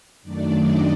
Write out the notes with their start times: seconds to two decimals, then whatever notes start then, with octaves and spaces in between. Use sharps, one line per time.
0.22 F#2 D#3 F#3 A3 D4 D5
0.55 D#5